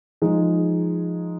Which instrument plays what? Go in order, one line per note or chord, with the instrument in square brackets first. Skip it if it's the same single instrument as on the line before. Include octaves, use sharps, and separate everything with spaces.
[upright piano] F3 G#3 D#4 G#4